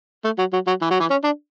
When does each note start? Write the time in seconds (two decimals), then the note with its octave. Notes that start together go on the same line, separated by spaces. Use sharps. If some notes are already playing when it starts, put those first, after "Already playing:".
0.24 A3
0.38 F#3
0.53 F#3
0.67 F#3
0.81 E3
0.90 F#3
1.00 E3
1.10 C#4
1.24 D4